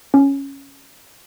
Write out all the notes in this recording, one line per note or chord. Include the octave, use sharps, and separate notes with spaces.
C#4